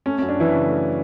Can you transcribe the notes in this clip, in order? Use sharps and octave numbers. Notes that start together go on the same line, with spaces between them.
A3 C#4
F#2 C#4
D4
E3 F#3 E4
C#3
A3